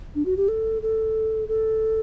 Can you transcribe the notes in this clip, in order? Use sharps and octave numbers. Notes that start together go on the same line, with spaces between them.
D4
F#4
G4
A4
A4
A4